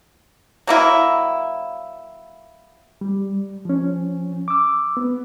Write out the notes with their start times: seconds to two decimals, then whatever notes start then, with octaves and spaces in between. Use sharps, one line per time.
0.67 F#3 A#3 E4
3.01 G3
3.65 F3 C#4
4.48 D6 E6
4.97 B3